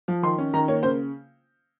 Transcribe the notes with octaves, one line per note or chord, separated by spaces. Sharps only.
F3
D#3 C6
C#4
D#3 A#5
A#3 C#5
C#3 C5